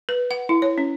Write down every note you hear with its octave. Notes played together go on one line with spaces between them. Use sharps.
B4
F#5
E4
C#5
C#4